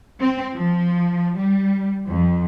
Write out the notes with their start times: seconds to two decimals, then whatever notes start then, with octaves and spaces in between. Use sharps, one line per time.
0.20 C4
0.54 F3
1.38 G3
2.07 F2